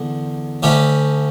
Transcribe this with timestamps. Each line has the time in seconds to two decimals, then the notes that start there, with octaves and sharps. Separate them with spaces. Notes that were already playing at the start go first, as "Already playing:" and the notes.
Already playing: E2 D3
0.63 D2 D3 A3 C#4 G4